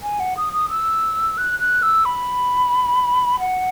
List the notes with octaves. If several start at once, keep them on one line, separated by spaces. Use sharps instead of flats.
G#5
F#5
D#6
D#6
E6
F#6
F#6
E6
B5
F#5